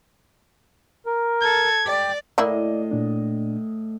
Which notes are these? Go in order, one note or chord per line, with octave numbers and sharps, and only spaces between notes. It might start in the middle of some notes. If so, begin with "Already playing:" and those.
A#4
A4 G#6
G4 D5
A2 A3 A#3 E4 D5 D#5
A#2 D4